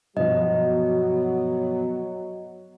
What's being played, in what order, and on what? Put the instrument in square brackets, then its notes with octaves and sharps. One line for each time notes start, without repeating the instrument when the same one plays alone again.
[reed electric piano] G2 B2 F3 [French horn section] F#3 [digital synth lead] B3 [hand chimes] D#5